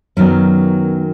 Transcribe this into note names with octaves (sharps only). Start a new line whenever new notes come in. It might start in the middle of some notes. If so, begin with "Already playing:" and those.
F#2 D#3 F#3 B3 C#4